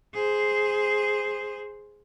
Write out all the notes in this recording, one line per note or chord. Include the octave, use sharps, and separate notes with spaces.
G#4 C5